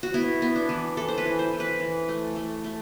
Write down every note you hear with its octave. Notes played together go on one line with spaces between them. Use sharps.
F#4
B3 E4
B3
D4
E3
E3 A4
C5
B4
E3
C5
E3
B4
E3
A3
A3
A3